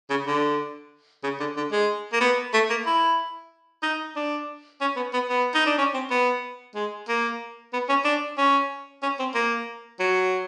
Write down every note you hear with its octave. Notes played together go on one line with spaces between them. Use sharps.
C#3
D3
C#3
D3
D3
G#3
A#3
B3
A3
A#3
E4
D#4
D4
C#4
B3
B3
B3
D#4
D4
C#4
C4
B3
G#3
A#3
B3
C#4
D4
C#4
C#4
C4
A#3
F#3